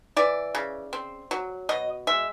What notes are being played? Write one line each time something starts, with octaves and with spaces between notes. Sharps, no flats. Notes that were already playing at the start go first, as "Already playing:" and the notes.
E3 D5
C#3
C4
F#3
B2 D#5
G#3 E5